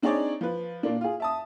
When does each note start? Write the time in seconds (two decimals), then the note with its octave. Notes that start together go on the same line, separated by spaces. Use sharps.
0.02 C4 D4 D#4 G#4 C#5 D5
0.41 F3 B4
0.83 A#2 A#3 D4
1.01 F4 G#4
1.20 E5 A5 D#6